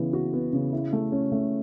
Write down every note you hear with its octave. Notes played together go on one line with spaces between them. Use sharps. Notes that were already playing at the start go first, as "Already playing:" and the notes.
Already playing: C#3 E3 B3
F#4
B3
C#3
E4
A3
C#4
A3